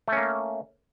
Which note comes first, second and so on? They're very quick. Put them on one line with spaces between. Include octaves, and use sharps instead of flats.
A3 C#4 A#3